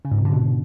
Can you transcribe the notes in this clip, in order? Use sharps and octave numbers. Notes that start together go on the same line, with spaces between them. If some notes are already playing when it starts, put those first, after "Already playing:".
C#3
G#2
C3
D3
B2